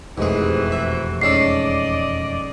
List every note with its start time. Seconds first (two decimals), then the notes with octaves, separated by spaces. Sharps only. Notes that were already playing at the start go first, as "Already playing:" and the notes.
0.18 E1 F2 G#2 C3 E3 A3 F#4 G#4
0.72 E5
1.21 G#2 C#4 A4 D5 D#5 C7